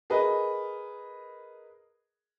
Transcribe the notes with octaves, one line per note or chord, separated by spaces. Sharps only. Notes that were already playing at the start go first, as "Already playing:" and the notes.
G#4 A#4 B4 D#5